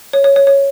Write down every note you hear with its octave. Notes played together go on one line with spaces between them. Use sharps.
C#5
C#5
C#5
C#5